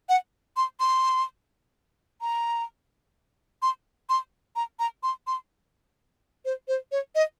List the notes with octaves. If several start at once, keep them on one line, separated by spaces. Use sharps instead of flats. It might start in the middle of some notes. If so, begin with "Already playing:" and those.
F#5
C6
C6
A#5
C6
C6
A#5
A#5
C6
C6
C5
C5
C#5
D#5